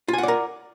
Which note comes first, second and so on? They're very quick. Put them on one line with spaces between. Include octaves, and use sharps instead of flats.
F4 G#5 F#5 D5 A#4